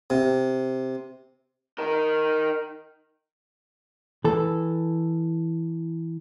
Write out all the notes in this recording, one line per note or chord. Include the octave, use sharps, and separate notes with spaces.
C3
D#4 A#4
E3 A4